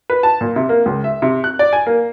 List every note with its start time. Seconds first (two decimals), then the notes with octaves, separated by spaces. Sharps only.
0.10 B4
0.23 A5
0.41 A#2
0.56 C3
0.69 A#3
0.86 C#2
1.04 E5
1.22 C3
1.44 F#6
1.59 D5
1.73 G#5
1.86 A#3